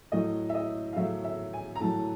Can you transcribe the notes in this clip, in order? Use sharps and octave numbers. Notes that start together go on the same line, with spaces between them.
A2 F#3 D#5
E5
D#5
F5
A2 F#3 E5
E5
G#5
A#5
A2 F#3 A5